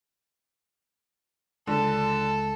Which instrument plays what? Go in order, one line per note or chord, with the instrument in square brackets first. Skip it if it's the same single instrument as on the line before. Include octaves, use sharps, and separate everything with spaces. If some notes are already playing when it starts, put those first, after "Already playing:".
[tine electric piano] C#2 [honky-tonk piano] D3 [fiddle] A4